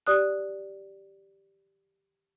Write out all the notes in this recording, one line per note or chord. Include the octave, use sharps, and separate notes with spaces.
G4 D5 D#6 F#6